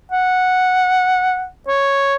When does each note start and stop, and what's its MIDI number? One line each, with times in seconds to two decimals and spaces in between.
0.12 1.47 78
1.68 2.15 73